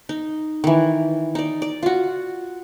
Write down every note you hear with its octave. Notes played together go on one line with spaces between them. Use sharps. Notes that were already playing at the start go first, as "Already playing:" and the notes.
D#4
D#3 E3
D#4 D5
D5
F4 F#4